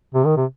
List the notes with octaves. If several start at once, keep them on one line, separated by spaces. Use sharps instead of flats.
C3
D#3
C3